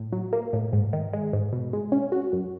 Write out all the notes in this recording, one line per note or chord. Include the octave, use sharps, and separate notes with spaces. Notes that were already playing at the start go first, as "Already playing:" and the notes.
Already playing: A2
F#3
A#3
A2
G#2
D#3
G#3
G#2
B2
G#3
C#4
F#4
F#2